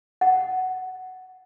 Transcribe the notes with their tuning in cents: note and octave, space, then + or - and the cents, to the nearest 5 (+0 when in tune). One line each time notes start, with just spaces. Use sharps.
F#5 +10